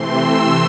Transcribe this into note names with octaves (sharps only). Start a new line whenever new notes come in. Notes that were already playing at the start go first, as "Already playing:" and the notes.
Already playing: C3 E3 A3 C4 C6
E6